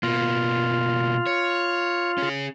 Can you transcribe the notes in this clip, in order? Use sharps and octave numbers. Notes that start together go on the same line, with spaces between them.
B2 A#3 F4
C#5
C#4 G#4